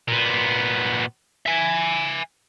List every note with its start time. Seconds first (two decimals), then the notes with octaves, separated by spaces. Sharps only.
0.08 A#2 B3
1.46 E5 G#5